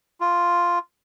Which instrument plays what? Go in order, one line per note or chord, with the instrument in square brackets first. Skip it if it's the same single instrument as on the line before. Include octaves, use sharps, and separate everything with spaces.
[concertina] F4